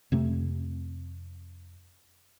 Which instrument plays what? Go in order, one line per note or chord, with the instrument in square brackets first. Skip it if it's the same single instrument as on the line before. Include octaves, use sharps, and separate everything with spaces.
[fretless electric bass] F2 C3 A3